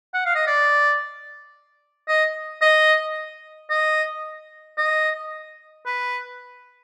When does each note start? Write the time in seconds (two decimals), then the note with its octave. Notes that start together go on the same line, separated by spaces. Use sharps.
0.14 F#5
0.25 F5
0.35 D#5
0.47 D5
2.08 D#5
2.62 D#5
3.70 D#5
4.78 D#5
5.86 B4